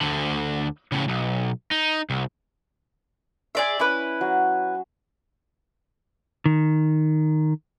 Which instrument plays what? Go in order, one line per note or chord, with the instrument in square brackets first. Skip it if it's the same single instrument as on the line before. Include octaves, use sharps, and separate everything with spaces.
[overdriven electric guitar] D2 D3
A2 C#3
B1
D#4
C2
[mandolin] G#4 D5 E5 [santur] C6 D6
[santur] C#4 [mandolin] E4 B4
[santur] F#3
[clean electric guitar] D#3